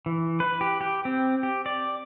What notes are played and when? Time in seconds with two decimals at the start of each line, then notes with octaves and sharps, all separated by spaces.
0.06 E3
0.40 B4
0.61 G4
0.81 G4
1.05 C4
1.43 G4
1.66 D5